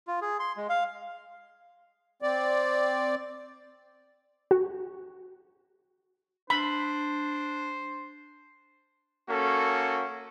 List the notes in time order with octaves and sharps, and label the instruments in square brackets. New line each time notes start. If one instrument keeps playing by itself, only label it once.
[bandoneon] F4
G#4
C6
G#3
F5
[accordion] C4 D5
[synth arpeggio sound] F#4
[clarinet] D4 [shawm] C5 [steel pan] B5
[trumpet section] A#3 C#4 F#4 A4